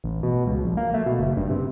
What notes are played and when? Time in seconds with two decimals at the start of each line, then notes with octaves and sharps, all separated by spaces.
0.04 A1
0.23 B2
0.47 C#2
0.64 A#1
0.77 A#3
0.94 A3
1.06 B2
1.19 F#1
1.37 G2
1.50 C3